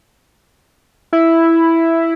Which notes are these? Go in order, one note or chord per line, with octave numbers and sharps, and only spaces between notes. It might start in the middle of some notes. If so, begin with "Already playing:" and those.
E4